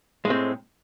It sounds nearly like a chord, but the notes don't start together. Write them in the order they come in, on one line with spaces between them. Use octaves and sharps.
G#3 A2 C4